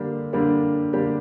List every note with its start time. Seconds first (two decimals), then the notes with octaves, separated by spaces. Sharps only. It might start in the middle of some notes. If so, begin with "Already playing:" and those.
Already playing: D3 G3 A#3 D4 G4
0.33 D3 G3 A#3 D4 G4
0.93 D3 G3 A#3 D4 G4